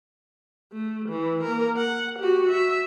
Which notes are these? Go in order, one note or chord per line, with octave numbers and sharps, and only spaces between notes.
A3
E3
A#3 A#4
F#5
F#4 G4
E5